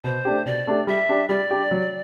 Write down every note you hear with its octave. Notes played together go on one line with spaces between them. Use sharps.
B2 C5
A3 D4 G4
B2 D5
A3 D4 G4
G3 E5
D4 G4
G3 D5
D4 G4
F#3